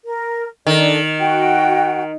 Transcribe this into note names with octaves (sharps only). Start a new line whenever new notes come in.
A#4
D#3 D4 A4 D5
F#4 F#5 G5